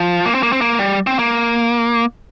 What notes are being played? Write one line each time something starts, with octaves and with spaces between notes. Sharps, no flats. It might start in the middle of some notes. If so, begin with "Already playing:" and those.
Already playing: F3
A#3
C4
A#3
C4
A#3
G3
C4
A#3